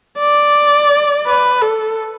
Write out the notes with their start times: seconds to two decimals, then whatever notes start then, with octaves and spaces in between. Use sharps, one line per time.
0.19 D5
1.27 B4
1.62 A4